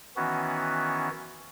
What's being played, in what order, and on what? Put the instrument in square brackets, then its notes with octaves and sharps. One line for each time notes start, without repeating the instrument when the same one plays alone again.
[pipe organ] D#3 E3 B3 C#4 F#4